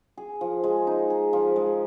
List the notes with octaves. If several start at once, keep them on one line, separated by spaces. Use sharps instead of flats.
G#4
F3
G#3
D#4
G#4
F3
G#3